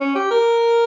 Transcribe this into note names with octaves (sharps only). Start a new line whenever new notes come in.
C#4
G4
A#4